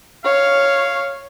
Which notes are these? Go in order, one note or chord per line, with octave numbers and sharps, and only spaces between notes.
C#5 F5